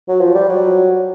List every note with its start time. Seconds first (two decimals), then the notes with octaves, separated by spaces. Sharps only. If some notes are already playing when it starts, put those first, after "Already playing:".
0.08 F#3
0.20 F3
0.34 G3
0.49 F#3